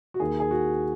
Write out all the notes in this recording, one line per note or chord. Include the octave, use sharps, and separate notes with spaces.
F#4
D#2 D#3 A#3 G#4
G#4
F#4